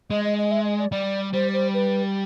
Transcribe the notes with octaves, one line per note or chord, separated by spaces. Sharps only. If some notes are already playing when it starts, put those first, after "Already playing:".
G#3 D#5
D#5
D#5
E5
D#5
D5
G3 D5
G3 C5
C5
B4